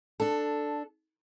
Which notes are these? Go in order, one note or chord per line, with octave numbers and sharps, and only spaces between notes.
D4 A4